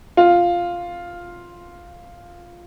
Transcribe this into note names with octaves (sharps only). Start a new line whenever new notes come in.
F4